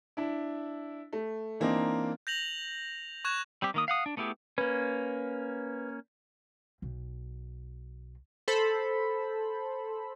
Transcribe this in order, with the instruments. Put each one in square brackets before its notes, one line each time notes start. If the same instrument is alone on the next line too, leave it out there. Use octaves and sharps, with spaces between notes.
[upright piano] D4 E4
A3
E3 A#3 C4 D4 D#4
[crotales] G6 A#6 F7 F#7
C#6 F#6 G#6 E7
[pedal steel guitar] G3 C4 G4
D#3 A#3 D#6
F5 F#5 D#6
D4
A3 B3 E4 G4 G#4
[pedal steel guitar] A#3 C#4 [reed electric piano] B4
[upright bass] B1
[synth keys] A4 C5 B5